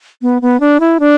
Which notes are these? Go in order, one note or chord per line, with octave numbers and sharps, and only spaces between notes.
B3
B3
D4
E4
D4